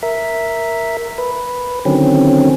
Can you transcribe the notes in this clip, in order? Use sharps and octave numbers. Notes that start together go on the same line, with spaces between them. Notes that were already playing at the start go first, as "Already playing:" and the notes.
A#4 E5
B4
D3 D#3 F#3 C4 C#4